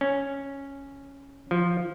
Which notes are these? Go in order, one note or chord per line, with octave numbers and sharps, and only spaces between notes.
C#4
F3